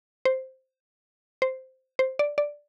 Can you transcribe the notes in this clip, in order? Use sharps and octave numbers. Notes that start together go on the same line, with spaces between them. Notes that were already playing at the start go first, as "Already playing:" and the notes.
C5
C5
C5
D5
D5